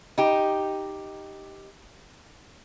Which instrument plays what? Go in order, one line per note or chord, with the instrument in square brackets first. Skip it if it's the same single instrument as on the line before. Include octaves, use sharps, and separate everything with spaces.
[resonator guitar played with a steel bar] D#4 G4